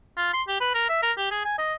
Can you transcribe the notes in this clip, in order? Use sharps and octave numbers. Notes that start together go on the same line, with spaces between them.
F4
C6
G4
B4
A#4
E5
A#4
G4
G#4
G#5
D#5